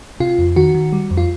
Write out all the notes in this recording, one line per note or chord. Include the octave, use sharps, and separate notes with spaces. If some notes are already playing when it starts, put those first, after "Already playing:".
C3 F4
F2
D#3 F#4
D#3
G3
F2
F4